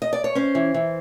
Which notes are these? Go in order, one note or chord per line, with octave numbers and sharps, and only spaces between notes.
D#5
D5
C#5
C#4 C5
E3
E3